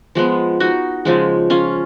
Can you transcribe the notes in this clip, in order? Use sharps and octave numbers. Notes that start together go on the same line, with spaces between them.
F3 G#3 B3
D#4 F#4
C#3 F3 G#3
C#4 F4